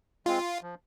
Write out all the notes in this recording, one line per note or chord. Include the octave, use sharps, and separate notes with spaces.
G#3 C4 F4
F3